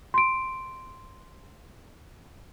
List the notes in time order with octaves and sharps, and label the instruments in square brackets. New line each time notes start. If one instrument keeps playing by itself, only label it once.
[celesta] C6 D7